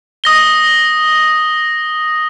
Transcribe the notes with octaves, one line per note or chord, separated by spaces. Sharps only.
D#6 A#6 G7